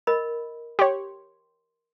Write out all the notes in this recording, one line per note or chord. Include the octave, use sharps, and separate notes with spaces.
A#4 D#5 B5
G4 C#5 C6